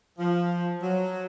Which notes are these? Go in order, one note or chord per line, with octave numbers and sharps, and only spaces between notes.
F3
F#3